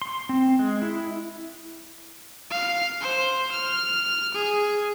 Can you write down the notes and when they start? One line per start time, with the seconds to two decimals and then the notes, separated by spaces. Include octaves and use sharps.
0.02 C6
0.29 C4
0.59 G#3
0.82 E4
2.50 F5
3.01 C5
3.52 F6
4.34 G#4